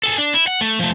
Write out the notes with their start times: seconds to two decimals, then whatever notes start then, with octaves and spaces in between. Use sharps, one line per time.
0.03 G#4 A4
0.18 D4
0.34 E4
0.47 F#5
0.61 A3
0.79 F3 A3